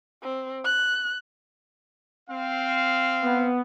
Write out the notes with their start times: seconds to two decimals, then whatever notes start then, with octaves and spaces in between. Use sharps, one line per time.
0.23 C4
0.65 F#6
2.30 C4 F5
3.22 B3